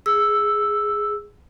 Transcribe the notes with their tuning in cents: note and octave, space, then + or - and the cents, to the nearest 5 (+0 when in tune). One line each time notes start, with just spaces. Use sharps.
G#4 +0 E6 +0